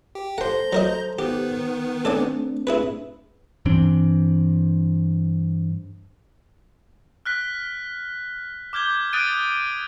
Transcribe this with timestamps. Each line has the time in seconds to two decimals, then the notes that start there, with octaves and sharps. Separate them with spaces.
0.15 G4
0.38 A4 C5 F#5 A#5 C6 G6
0.73 F#3 A#4 D#5
1.19 D#3 B3 G4
2.05 A3 C4 D4 A4 D5 G#5
2.67 E4 G#4 B4
3.66 G2 E3 C4 D4
7.25 F6 F#6 B6
8.73 D6 F6 G6 G#6 G7
9.13 D#6 F#6 G#6 A6 D7 D#7